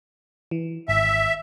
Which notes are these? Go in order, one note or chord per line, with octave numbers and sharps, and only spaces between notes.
E3
G#1 E5